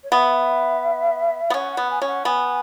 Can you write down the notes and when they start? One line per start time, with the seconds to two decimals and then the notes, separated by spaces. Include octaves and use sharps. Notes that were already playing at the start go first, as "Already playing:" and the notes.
0.03 C#5
0.11 B3 E5
1.50 B3
1.54 C#4 F#5
1.72 F#5
1.77 B3
1.90 G#5
2.02 C#4 G#5
2.07 F#5
2.25 B3 G#5